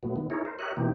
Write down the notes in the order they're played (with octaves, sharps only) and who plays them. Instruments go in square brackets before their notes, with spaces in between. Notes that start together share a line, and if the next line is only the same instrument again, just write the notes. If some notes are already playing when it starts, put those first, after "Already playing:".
[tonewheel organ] A#2 F#3 A3 B3
D#3 B3
D#4 E4 G#4 A#4 C#5
A#4 C5
G4 A#4 C#5 D#5 E5 F#6
B2 E3 A#3 C4 D#4 G4